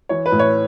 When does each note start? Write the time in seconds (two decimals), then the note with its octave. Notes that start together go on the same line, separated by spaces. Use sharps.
0.09 E3 C#5
0.26 B4
0.32 A2
0.39 C#5